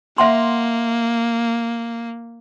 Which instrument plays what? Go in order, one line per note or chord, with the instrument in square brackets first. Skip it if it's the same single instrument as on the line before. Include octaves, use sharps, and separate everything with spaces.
[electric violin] A#3 [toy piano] E5 F#5 C6